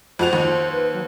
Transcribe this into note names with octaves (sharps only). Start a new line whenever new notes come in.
F2 F#4 C5 F7
D#2
B4
F#3